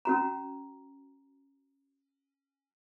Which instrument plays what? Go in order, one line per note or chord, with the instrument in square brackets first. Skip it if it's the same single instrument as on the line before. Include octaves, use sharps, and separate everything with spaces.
[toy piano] C#4 F#4 A#5